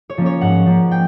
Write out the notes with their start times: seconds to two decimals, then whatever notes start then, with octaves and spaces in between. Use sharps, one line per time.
0.10 C#5
0.18 F3 A#3 C#4
0.26 C#5
0.41 G#2 F#5
0.66 F3 A#3 C#4
0.91 G5